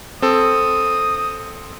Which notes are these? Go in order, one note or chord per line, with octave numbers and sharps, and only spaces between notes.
C4 A4 D#6